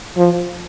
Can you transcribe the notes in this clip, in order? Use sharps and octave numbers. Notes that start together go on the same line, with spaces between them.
F3